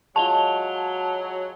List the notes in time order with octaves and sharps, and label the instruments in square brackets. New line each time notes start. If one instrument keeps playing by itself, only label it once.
[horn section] F#3 [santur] G#3 F4 [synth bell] A5 F7 G7